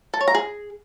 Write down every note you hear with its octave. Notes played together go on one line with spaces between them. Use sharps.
A4
C#5
A#5
G#4